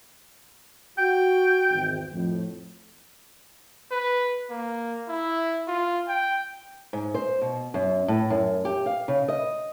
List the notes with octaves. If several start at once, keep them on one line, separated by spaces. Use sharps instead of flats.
F#4 G5
G#1 E2
F2 A2
B4
A#3
E4
F4
G5
G#2
C5
B2
F#2
A2
F#2
G4
F5
C#3
D#5